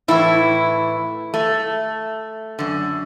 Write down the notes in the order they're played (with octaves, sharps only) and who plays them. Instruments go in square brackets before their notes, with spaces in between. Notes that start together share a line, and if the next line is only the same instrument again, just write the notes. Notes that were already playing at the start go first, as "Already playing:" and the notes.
[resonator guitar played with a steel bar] A2 E3 E4
A3
F#2 D3